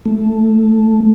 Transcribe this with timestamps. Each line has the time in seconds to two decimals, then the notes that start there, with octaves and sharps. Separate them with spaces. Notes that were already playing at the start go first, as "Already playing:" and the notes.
0.06 A3